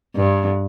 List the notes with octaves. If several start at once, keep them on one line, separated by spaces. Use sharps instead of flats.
G2